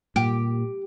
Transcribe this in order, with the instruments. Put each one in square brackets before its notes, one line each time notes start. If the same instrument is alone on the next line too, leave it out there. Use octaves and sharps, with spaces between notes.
[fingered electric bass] A#2 [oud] G4